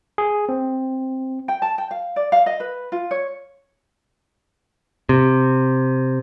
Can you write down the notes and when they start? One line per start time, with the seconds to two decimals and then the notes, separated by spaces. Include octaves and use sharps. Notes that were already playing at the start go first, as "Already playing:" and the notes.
0.18 G#4
0.49 C4
1.48 G5
1.62 A5
1.78 G5
1.91 F5
2.16 D5
2.32 F5
2.46 D#5
2.60 B4
2.92 F4
3.11 C#5
5.09 C3